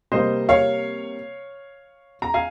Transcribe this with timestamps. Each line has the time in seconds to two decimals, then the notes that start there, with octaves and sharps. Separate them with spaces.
0.12 C3 G3 A#3 C5 D#5
0.49 C#5 F5
2.22 A#5
2.34 F5 G#5